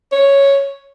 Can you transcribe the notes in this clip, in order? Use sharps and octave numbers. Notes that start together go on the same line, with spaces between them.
C#5